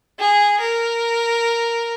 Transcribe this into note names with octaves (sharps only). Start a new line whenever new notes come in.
G#4
A#4